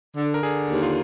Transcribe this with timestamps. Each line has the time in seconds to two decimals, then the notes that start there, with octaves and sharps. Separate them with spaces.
0.16 D3
0.34 A#4
0.43 D3 G#4
0.70 D#2
0.83 F4